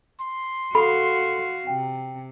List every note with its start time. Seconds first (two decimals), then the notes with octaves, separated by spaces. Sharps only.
0.21 C6
0.75 F#4 A4 F5 B5
1.67 C3 G5